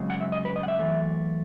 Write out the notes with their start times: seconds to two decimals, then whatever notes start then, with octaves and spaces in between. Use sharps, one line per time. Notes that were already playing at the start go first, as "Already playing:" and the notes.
Already playing: F#2 C#3 G#3
0.10 F#5
0.21 E5
0.32 D#5
0.45 B4
0.56 D#5
0.63 F#5
0.68 E5
0.79 F#2 E3 A3